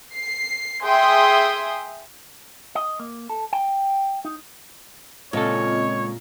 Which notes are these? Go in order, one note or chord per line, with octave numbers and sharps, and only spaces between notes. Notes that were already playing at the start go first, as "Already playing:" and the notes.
C7
G#4 E5 G5 C6 D#6
D#5
A#3
A4
G5
D#4
C#2 A#2 C4 F4 A4 C#5 D#5